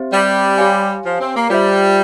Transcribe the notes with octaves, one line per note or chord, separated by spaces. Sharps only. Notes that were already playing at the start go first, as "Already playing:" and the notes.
Already playing: C4 G4 C5 E5
G3
G4 C#5 F5 G#5
F3
C4
A#3
G3 F4 C5 E5